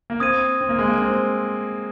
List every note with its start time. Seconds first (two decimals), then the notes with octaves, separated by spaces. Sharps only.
0.10 A#3
0.20 C4 D#6 G#6 D#7
0.61 C4
0.69 A#3
0.79 G#3
0.87 A#3
1.02 C4